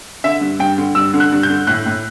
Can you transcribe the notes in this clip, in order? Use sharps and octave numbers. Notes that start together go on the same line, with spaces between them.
D3 E5
G2
G2 G5
D3
G2 E6
D3
F#6
G2
G6
D3
A2 F#6
A2